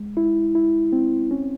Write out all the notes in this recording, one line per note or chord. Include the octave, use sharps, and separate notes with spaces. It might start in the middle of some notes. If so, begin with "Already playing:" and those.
Already playing: G#3
E4
E4
C4
C#4